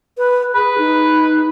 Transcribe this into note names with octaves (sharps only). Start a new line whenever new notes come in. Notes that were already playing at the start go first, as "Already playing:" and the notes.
B4
G#4 B4
D#4